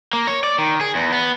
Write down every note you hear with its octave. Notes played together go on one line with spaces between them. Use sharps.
A#3
C#5
D5
D#3
G#4
E2
B3